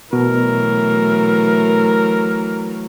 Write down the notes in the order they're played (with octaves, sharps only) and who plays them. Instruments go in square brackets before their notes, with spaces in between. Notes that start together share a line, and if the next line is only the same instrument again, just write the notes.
[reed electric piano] B2 [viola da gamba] E3 F#3 A3 [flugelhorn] A#4